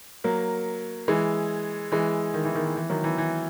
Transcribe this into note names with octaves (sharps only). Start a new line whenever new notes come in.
F#3 A#3
E3 G#3
E3 G#3
D#3
E3
D#3
E3
E3
D#3 F#3
E3
E3